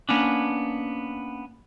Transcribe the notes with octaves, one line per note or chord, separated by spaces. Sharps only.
A#3 B3 C#4 D4